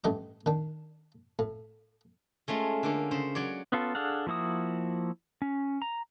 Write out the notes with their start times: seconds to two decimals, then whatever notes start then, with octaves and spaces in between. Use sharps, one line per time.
0.04 A1 G2 A3 D#5 D6
0.46 D#3 D4
1.39 A2
2.48 G#3 A3 C#4 F4
2.83 D3 A#3 C#4
3.11 C#3 C5
3.35 F#3 C#5 D5
3.72 B3 C#4 F4 A4
3.95 D4 G#4 A4 F5 F#5
4.27 F3 A#3 E4 F#4 D#6
5.42 C#4
5.82 A#5